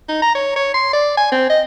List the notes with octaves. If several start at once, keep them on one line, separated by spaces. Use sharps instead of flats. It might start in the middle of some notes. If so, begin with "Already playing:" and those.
D#4
A#5
C#5
C#5
C6
D5
G#5
C4
D#5